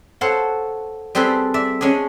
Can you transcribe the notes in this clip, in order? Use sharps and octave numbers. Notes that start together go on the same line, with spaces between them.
A4 C5 C#5 F5 F#5
G3 C4 G#4 A4 B4 C5
D5 E5
G#3 C#4 D4 G#4